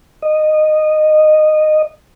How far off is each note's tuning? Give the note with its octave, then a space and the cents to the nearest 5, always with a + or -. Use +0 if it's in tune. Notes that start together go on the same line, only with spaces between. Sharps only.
D#5 -15